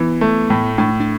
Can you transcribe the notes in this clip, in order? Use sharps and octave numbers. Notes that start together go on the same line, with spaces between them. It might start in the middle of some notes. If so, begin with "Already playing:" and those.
Already playing: E3 B3
A3
A2
A2 D4
D4